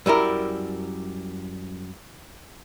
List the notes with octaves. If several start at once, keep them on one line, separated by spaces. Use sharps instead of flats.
F#2 G3 E4 A#4